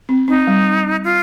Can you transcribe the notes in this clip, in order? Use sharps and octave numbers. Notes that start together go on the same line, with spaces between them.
C4
C4 D#4
G3
F4